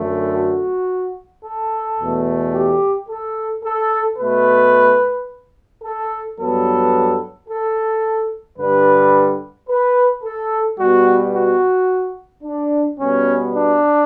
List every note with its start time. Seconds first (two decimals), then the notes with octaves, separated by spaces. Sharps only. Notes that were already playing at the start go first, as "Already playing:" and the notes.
Already playing: F#2 D3 A3
0.34 F#4
1.44 A4
1.98 E2 B2 A3
2.53 G4
3.09 A4
3.64 A4
4.18 B2 A3 B4
5.84 A4
6.38 G2 F#3 B3 A4
7.49 A4
8.58 G2 D3 G3 B4
9.69 B4
10.24 A4
10.79 B2 G3 B3 F#4
11.33 F#4
12.44 D4
12.99 B2 G3 B3 C#4
13.54 D4